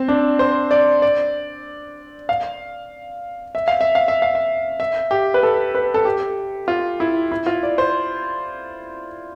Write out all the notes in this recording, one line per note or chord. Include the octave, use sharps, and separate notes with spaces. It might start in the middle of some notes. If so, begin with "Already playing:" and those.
Already playing: C4
D4
C5
D5
D5
F5
E5
F5
E5
F5
E5
F5
E5
E5
G4
B4
A4
B4
A4
G4
F4
E4
E4
F4
D5
C5